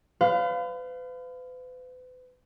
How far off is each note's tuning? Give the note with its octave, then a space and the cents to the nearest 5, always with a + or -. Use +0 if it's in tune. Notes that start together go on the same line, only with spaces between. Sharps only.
B4 +40 F5 +0